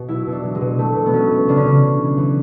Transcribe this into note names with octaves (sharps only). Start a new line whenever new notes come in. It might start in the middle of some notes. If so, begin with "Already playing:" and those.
Already playing: B2 F#4
F#3 E4
B2
D4
F#3
G#3
B2
F#3 A3
B2
B3
F#3 C#4
B2
C#3 D4
C#4
C#3 D4
C#3
E3
E3